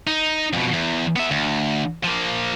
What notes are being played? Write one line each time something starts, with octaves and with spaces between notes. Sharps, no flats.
D#4
F2 B2
E2
B3 E5
D2
F3 A#3